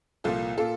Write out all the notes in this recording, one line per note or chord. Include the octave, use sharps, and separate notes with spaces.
C2 A#2 F3 F4 A4
A#2 F4 A4